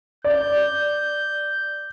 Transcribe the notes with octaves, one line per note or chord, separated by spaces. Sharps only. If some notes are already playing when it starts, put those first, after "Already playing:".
D5 G6